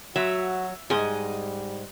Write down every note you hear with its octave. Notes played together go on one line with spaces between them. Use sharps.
F#3 F#4 E5
G#2 G3 G#4 D#5 G#5